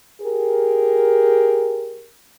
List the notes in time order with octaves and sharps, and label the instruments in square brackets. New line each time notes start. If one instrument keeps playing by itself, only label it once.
[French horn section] G4 G#4 A#4